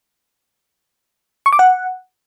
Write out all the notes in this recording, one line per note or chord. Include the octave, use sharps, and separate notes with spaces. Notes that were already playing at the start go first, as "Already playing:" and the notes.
C#6
D6
F#5